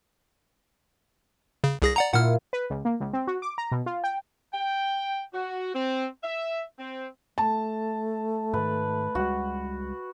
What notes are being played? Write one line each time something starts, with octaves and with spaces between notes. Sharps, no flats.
C#3
C2 G#4 A#6
D5 F#5 A#5
A#2 E4 F4 F#5 F6
B4
C#2
A#3
C#2
C4
F#4
D6
A#5
B2
F4
G5
G5
F#4
C4
E5
C4
A3 A5
G#2 D#3 B4
C#2 G3 G#3 F#4